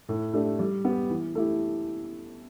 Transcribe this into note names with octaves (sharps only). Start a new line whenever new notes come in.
A2
A3 D4 G4
G3
B3 G4
E3
A3 E4 G4